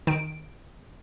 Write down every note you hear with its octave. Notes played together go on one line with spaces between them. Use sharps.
D#3 D7